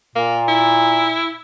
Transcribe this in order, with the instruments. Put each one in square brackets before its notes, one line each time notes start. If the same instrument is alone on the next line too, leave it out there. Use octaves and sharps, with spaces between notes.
[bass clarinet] A#2 [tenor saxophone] A#3
[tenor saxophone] E4